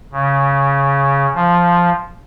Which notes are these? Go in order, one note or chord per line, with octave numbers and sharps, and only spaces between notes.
C#3
F3